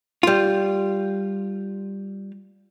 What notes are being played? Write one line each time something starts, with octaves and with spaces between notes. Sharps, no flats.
G3 F4